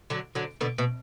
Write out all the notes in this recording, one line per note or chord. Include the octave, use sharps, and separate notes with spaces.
D3 F#3
D3 F#3
B2 D3
B2